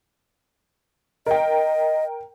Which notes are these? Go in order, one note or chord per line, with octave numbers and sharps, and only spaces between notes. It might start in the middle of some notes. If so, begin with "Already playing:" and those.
A#4 D#5 G5